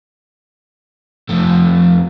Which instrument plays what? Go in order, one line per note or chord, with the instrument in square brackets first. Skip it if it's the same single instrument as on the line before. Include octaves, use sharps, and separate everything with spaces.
[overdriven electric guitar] F2 A3